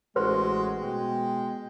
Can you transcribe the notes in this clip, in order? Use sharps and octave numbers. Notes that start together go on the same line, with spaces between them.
A1 G#3 F#4 B4 C5 C6
B2 G#3 G5